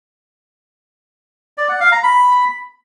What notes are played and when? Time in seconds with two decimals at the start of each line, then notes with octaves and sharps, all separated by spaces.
1.58 D5
1.69 F#5
1.80 F5
1.92 A#5
2.03 B5